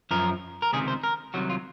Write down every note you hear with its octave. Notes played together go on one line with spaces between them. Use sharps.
F#2 F3 A#4
A#4
C#2 C3 D#3 G#4
C5
A#4
C2 C3 D#3 F#3 F#4
F4